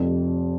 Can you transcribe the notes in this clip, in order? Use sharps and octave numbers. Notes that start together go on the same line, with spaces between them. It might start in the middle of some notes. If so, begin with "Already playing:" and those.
Already playing: F1 F2 C3